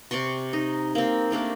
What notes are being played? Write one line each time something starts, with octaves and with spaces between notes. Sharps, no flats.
C3 D5 C6 C#6
D#4
A#3 C4
G3 A3 A#3 D4